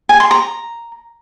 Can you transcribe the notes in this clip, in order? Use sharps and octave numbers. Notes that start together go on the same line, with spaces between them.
G#5
C6
A#5